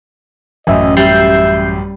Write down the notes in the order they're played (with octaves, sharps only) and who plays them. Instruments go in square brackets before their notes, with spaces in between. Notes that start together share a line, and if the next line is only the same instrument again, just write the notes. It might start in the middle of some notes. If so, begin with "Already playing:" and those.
[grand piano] A1 F#2 [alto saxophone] D#5 [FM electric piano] E5 G#5
[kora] G3 [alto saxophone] E5 [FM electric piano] G6 C7